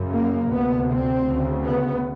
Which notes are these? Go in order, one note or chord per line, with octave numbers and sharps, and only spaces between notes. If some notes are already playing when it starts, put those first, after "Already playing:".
Already playing: F#2 C#3
A#3
D2 C3 B3
C4
D2 C#3
B3